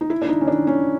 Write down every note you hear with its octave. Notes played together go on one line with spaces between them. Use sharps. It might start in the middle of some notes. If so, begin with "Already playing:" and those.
D#4
E4
D4
D#4
C#4
D4
C#4